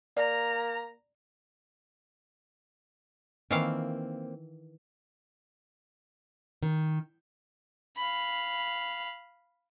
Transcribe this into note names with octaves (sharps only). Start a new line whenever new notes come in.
A#3 D5 A#5
D#3 E3 A#3 C4 F5
D#3
F5 B5